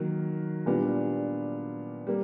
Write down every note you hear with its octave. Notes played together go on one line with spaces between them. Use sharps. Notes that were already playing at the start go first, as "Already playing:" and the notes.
Already playing: D#3 F#3 A#3
A#2 G3 B3 D4
G3 A#3